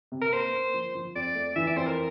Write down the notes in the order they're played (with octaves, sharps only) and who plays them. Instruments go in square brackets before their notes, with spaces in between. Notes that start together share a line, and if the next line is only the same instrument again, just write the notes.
[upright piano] C3
[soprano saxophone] A#4
[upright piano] A#3 [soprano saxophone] C5
[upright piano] A#3
F3
F3
[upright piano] F2 [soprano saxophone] D5
[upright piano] A3
[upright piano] E3 [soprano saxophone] E5
[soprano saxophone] D5
[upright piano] F2 [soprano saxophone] C5
[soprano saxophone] A#4